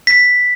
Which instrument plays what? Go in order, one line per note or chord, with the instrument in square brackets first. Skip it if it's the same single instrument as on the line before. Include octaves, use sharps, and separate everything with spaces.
[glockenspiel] B6